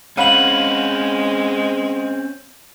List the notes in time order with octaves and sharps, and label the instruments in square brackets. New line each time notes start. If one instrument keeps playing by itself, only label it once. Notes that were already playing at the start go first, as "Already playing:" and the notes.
[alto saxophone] G#3 [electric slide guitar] C4 C#4 [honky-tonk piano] F5 F#5 B5 [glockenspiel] D#7 F#7